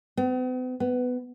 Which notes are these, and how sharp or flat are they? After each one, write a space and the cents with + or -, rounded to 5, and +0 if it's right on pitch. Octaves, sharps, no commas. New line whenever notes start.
B3 +45
B3 +15